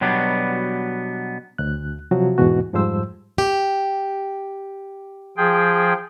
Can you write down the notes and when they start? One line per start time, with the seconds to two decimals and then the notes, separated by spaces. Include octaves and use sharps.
0.01 B2 F#3 G3 B3 D4
1.58 D2 F#6
2.11 C3 F3 F#3 F#4
2.38 E2 G#2 B2 E3 F#4
2.73 F2 G#2 F3 G3 C5 E6
3.38 G4
5.37 F3 G#4 G5